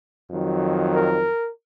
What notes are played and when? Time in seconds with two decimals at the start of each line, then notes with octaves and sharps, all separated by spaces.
0.30 F2 D#3 F#3
0.93 A#4